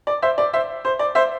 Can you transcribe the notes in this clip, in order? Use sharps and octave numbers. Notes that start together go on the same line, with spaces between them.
D5
C5 E5
D5
C5 E5
C5
D5
C5 E5